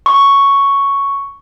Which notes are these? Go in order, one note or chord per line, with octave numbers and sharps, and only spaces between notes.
C#6